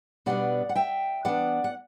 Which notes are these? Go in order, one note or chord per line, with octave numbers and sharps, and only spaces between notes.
B2 G3 B3 D4 D5 F#5
F#5
E5 G5
E3 B3 D4 D5 F#5
F#5